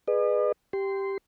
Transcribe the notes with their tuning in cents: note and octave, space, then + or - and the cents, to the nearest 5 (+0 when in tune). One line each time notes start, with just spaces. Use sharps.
G#4 +0 B4 +0 D#5 -45
G4 +0 C6 -15